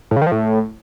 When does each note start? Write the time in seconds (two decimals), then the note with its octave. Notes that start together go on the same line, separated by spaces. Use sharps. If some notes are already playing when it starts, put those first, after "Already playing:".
0.11 A2
0.16 C#3
0.21 D#3
0.27 F3
0.32 A2